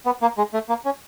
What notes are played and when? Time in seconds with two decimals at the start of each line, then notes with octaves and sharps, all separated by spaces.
0.06 B3
0.22 A#3
0.38 G#3
0.54 A3
0.69 A#3
0.85 C#4